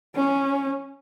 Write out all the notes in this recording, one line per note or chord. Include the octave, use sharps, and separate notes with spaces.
C#4